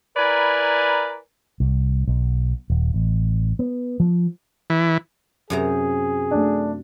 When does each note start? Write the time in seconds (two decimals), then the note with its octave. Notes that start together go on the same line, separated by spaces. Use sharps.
0.17 E4 A#4 B4 D5 G#5 A#5
1.60 C2
2.08 B1
2.70 D#1
2.94 A1
3.59 B3
4.00 F3
4.70 E3
5.50 F#2 C3 G#4 A#5
6.31 A3 D4